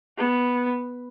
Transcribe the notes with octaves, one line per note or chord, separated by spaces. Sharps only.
B3